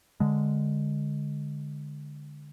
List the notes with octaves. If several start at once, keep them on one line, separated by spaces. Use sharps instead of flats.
D3 G#3